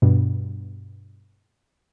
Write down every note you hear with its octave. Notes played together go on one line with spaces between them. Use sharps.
G2 B2